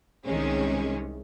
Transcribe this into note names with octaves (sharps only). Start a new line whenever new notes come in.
C2 C3 D#3 G#3 C#4